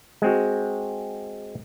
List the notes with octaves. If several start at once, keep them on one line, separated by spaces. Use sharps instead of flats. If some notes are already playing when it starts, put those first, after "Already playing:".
G#3 C4 F#4